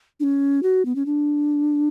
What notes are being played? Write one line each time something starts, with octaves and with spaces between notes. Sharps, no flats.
D4
C#4
F#4
B3
C#4
D4